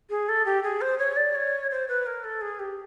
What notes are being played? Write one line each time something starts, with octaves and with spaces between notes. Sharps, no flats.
G#4
A4
G4
G#4
C5
C#5
D5
C#5
C5
B4
A#4
A4
G#4
G4